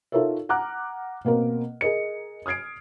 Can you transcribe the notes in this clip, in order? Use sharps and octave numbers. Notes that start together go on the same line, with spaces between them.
D#4 F4 A4 A#4 C#5 E5
F#5 A#5 D6 F6 F#6
B2 A#3 C4 A#4
G#4 A#4 D#5 C#7
D#6 F6 G#6 C7 D7